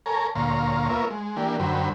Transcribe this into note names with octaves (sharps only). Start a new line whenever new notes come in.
A4 A#4 C#5 G#5 A#5
D2 A#2 C#5 F5 A#5 C6
A#3 B3 F4 A#4 C#5 E5
G#3
E3 A#3 D4 G4
F#2 D3 F#3 C5 G5 B5